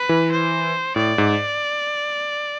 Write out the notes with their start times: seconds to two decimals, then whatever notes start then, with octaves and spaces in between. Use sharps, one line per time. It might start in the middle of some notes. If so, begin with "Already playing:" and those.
Already playing: B4
0.09 E3
0.31 C5
0.96 A2 D5
1.18 G#2